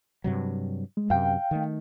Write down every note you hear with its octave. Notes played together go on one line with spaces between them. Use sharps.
G2 C3 F#3
G#3
F#2 C3 F5 G5
D#3 A3